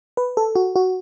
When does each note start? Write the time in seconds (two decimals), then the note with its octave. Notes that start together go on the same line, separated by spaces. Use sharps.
0.17 B4
0.37 A4
0.56 F#4
0.76 F#4